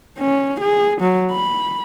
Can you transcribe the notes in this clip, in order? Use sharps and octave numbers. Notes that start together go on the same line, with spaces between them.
C#4
G#4
F#3
B5